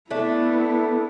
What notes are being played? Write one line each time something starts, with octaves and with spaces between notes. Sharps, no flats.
A3 B3 D4 E4